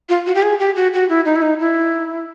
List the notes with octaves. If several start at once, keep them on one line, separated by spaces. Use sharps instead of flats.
F4
F#4
G4
G#4
G4
F#4
F#4
E4
D#4
E4
D#4
E4